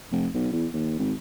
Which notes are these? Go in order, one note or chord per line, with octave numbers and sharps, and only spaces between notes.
F1
B1
E2
D#2
G#1